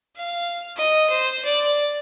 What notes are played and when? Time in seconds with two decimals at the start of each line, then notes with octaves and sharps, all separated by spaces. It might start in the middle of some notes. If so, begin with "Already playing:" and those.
0.16 F5
0.76 D#5
1.09 C5
1.45 D5